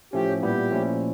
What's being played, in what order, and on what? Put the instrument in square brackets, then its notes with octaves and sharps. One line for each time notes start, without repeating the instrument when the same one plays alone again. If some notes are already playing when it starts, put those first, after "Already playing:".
[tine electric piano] A2 F3 A3 C#4 [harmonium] G4
[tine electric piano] A#2 G3 B3 E4 [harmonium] G4
[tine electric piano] A#2 F3 A3 C#4 E4